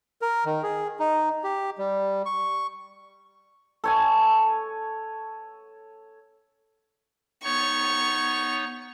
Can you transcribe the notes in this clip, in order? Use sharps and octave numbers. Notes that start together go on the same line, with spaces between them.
A#4
D#3
G#4
D#4
G4
G3
C#6
A4 C#5 G#5
B3 D#4 C#5 C#6